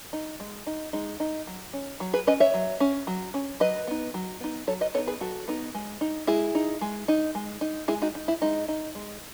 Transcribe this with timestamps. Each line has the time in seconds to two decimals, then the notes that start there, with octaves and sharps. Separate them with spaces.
0.13 D#4
0.40 G#3
0.67 D#4
0.93 G#3 D#4
1.20 D#4
1.47 F#3
1.73 C#4
2.00 F#3
2.13 G#4 B4
2.27 C#4 B4 D#5
2.40 C#5 E5
2.54 F#3
2.80 C#4
3.07 F#3
3.34 C#4
3.60 F#3 B4 D#5
3.87 B3 D#4
4.14 F#3
4.40 B3 D#4
4.67 F#3 A4 C#5
4.81 B4 D#5
4.94 B3 A4 C#5
4.98 D#4
5.08 G#4 B4
5.21 F#3 F#4 A4
5.48 B3 D#4
5.75 G#3
6.01 D#4
6.27 G#3 E4 G#4
6.55 D#4
6.81 G#3
7.08 D#4
7.35 G#3
7.61 D#4
7.88 G#3 E4 G#4
8.02 D#4 F#4
8.15 D#4
8.28 E4
8.42 G#3 D#4
8.68 D#4
8.95 G#3